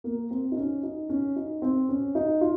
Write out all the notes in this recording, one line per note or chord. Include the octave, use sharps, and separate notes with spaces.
A#3
C4
D#4
C#4
D#4
C#4
D#4
C4
C#4
D#4
F4